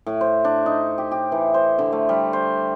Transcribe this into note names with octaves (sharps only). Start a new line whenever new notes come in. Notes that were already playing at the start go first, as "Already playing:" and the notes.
A2
C5
D4
D#4
G4
G4
E3
C5
D3
A3
G3
C5